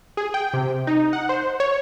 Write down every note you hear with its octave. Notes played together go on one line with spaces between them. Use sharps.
G#4
G5
C3
D#4
F#5
C5
C#5